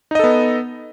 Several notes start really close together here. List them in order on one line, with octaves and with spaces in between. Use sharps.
D#4 D#5 A4 B3